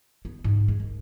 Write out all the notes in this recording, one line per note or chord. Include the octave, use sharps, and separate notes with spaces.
B3
G#2 C3
G#3
G#1